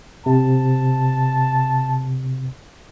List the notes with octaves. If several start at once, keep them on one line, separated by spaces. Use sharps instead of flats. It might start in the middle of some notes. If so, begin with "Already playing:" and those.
C3 A5